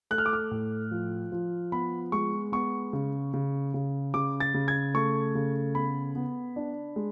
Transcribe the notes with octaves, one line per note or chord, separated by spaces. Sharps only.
A3 F#6
F6
D6
F6
A2
F3
F3
B3 B5
G#3 C#6
B3 C#6
C#3
C#3
C#3
C#3 D6
A6
C#3
G#6
A3 C#6
C#3
B3 B5
B3
D4
G#3